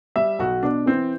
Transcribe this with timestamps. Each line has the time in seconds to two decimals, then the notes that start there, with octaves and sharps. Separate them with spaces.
0.16 G3 E5
0.39 B1 F#4
0.63 B2 D4
0.86 E3 C4